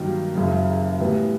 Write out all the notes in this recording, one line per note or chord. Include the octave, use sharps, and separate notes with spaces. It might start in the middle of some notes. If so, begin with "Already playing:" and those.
Already playing: G2 D#3 F#3 A#3
F#1 F#2 C#3
A2 E3 G3 B3